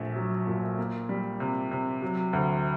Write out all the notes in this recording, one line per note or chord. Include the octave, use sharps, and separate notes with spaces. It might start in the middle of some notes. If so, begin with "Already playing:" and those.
Already playing: A#1 A3
F#3
A#2
A#3
G3
C3
C3
F#3
D2